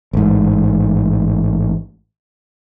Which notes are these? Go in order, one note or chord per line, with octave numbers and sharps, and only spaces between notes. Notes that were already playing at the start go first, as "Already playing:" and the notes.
A1 G#2